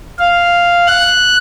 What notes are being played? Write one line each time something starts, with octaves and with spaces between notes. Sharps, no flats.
F5
F#6